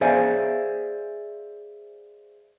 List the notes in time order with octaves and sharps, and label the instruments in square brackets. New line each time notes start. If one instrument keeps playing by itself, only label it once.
[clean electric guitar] G#4 C5 D5 E5 F5 G#5